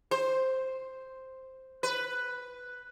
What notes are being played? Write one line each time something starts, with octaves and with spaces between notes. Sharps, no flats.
C5
B4